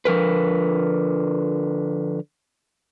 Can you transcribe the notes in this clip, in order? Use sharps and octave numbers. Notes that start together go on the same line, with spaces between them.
D3 F3 A#4 B4